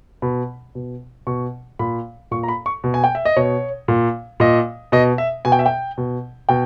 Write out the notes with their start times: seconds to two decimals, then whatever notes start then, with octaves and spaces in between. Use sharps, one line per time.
0.22 B2 B5
0.75 B2
1.27 B2 C#6
1.79 A#2 B5
2.31 A#2 C#6
2.43 A#5
2.48 B5
2.66 C#6
2.84 B2
2.94 G#5
3.04 G5
3.15 E5
3.25 D#5
3.36 B2 C#5
3.88 A#2
4.40 A#2 D#5
4.92 B2 D#5
5.18 E5
5.45 B2 G#5
5.52 G5
5.59 E5
5.66 G5
5.98 B2
6.49 B2 G5